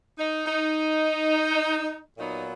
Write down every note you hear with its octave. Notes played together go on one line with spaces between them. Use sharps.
D#4
D#4
A#2 F#3 B3 D#4